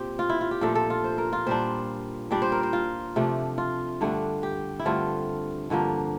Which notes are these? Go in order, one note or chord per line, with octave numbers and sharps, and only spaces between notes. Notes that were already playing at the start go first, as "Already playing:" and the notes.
Already playing: A#2 C4 G4
F4
E4
F4
G4
A#2 F3 A3 D4 A4
A4
F4
C5
A#4
F4
A#2 G3 D4 C5
A#2 G3 D4 D5
C5
A#4
C5
F4
C3 F3 A3 D4
F4
G2 D3 A3 D4
G4
E4
G2 D3 A3 C4 F4
G2 D3 F3 A#3